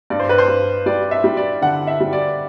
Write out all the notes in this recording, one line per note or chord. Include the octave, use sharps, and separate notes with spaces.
G2 D5
C5
B4
C5
G2
G3 D5
E5
G3
D5
D3 F#5
E5
G3
D5